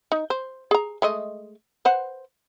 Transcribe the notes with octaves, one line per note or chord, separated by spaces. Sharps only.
D#4
C5
G#4 A#5
G#3 A3 D#5
B4 C5 F#5